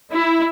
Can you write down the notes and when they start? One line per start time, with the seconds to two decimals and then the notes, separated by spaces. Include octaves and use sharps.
0.13 E4